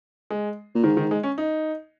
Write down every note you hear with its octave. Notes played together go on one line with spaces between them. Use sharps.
G#3
A#2
G#2 D#3
D#3
G#3
C#4
D#4